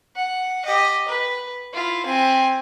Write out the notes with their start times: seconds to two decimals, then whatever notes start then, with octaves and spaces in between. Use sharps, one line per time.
0.16 F#5
0.65 G4 D#5
1.08 B4
1.74 E4 F4
2.06 C4 G#5